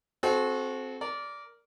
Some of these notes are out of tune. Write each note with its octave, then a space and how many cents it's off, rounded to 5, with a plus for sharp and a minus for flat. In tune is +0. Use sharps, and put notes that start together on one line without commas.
C4 +0 F#4 -15 A4 -35
A#4 +0 D5 -15